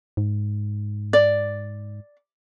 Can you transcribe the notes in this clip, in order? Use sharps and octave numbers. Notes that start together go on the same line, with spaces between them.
G#2
D5